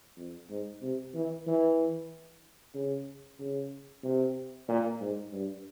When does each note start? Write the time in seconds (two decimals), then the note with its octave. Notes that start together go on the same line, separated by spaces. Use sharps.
0.17 F2
0.50 G#2
0.82 C3
1.14 E3
1.47 E3
2.75 C#3
3.40 C#3
4.03 C3
4.68 A#2
5.01 G#2
5.33 G2